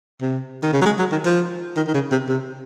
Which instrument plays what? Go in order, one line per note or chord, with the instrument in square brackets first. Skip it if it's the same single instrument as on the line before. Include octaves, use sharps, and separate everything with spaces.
[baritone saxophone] C3
D#3
C#3
F#3
G#3
F#3
D#3
F3
D#3
D#3
C#3
C3
C3